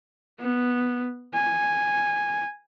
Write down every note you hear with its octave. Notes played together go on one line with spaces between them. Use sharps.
B3
G#5